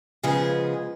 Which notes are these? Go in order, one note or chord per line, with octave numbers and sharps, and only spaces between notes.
C#3 F3 G#3 B3 G#4